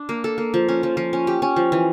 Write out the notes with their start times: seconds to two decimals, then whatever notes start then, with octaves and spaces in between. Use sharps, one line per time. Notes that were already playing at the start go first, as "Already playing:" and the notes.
Already playing: D4
0.09 A#3
0.24 A4
0.38 A#3
0.54 F3
0.69 C#4
0.83 F3
0.97 F3
1.13 C#4
1.27 G4
1.42 C#4
1.56 F3
1.72 E3